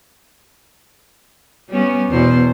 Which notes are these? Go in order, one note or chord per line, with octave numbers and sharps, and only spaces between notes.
G3 B3 C#4
E2 B2 C5